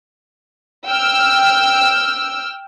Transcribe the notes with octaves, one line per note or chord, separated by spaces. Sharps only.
G5 E6 F6